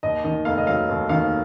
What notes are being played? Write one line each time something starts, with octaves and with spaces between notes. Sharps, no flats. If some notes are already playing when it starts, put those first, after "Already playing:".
D#2 D#5
D#3 D#5
F1 F5
D#5
F#3 F5
D#2
D#3 F5